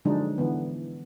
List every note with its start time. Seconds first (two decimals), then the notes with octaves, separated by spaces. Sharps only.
0.05 D3 F3 F#3 G#3 D4 D#4
0.38 D3 E3 B3